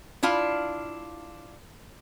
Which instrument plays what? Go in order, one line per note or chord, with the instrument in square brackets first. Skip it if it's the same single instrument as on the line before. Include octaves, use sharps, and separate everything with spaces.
[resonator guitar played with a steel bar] D4 E4 F4 F5